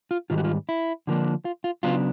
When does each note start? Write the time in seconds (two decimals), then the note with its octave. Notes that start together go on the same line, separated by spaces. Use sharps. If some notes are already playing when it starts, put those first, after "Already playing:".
0.11 F4
0.30 G#2 D#3 G3 F4
0.38 F#4
0.44 F4
0.69 E4
1.07 D3 F3 A#3 D4
1.45 F4
1.64 F4
1.83 C#3 F#3 B3 D4 F4